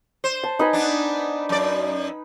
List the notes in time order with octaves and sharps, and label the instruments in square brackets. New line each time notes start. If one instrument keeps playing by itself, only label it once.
[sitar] C5
[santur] A5
D#4 B4 G#5
[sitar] B3 D4
F#2 D5